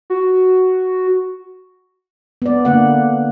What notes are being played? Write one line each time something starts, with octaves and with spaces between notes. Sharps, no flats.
F#4
B3 D5
D3 A#3 F#5